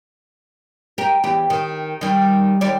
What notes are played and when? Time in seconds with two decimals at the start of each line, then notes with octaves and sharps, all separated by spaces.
0.98 G4 A#4
1.24 E2 G4
1.50 D#3
2.01 D#3 G3
2.61 D#2 G3 D5